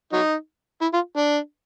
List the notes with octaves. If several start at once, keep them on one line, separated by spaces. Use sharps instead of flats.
F#3 D#4
E4
F4
D4